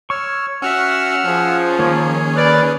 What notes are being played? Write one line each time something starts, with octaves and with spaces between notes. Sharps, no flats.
C#5 C#6 E6 F6
C#4 F#4 E5 F#5 E6 F6
F3 C#4 G#4
D#3 A#3 C#5
B4 D5 F6 F#6